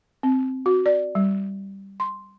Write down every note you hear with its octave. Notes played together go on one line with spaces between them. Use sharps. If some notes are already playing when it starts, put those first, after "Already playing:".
C4
F#4
D5
G3
C6